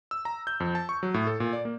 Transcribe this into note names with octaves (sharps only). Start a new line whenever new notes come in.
E6
A#5
G6
F2
A5
C#6
F#3
A2
A4
A#2
D5
A#3